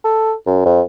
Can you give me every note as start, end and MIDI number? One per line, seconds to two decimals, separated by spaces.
0.04 0.34 69
0.46 0.61 42
0.65 0.82 41